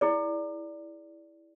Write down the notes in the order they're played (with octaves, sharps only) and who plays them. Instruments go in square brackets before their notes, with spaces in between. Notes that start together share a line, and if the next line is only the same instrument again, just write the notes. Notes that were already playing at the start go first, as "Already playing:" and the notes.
[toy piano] E4 G#4 D5